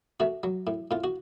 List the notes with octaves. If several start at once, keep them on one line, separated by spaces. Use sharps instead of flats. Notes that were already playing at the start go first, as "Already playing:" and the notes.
A3 F#4
F#3
A2
A2 F4
F#4